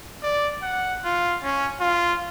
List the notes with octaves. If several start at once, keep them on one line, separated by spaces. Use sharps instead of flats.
D5
F#5
F4
C#4
F4